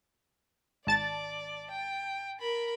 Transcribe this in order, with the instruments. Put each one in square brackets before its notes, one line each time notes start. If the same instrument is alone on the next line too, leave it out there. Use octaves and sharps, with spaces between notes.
[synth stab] G#1 A5 A6 [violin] D5
[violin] G5
A#4 B5